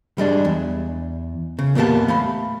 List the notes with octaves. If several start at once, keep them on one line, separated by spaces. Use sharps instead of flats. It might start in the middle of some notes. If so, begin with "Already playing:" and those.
G3 G#3 D4
E2
C#3
E2 A#2 A#3 B3 G4 A5
A3 F5 B5